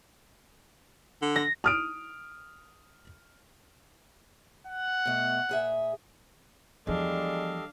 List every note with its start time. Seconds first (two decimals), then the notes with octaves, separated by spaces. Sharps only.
1.22 D3
1.36 A#6
1.64 D#6 F6 D7
4.67 F#5
5.05 B2 A3
5.49 A#2 G#4 E5
6.87 E2 F3 G3 G#3 D4 A4 D#5 F5